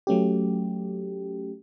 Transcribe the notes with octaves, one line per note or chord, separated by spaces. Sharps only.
F#3 A3 C#4 G4